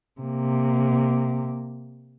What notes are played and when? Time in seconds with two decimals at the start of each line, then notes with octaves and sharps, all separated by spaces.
0.21 C3 A#3